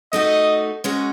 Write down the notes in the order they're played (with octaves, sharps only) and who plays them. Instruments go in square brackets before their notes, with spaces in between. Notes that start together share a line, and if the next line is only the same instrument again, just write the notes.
[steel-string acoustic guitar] A3 D#4 F#4 [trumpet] D#5
[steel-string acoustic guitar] G#3 C#4 F#4